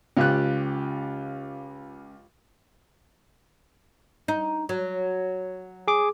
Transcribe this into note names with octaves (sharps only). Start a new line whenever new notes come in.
C#2 F4 G4 F#6
D#4
F#3
G#4 D6